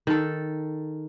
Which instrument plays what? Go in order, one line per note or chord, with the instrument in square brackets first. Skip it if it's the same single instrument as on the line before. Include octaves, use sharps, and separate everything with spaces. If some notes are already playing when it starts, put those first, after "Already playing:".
[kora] D#3 A4